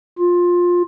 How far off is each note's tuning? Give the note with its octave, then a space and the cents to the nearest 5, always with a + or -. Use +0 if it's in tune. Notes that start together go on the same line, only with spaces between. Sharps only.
F4 +15